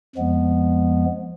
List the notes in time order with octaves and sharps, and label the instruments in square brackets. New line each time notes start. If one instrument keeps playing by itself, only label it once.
[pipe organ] F2 F3 G#3 B3